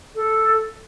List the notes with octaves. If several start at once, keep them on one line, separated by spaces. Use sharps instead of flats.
A4